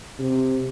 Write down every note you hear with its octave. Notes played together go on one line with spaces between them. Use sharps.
C3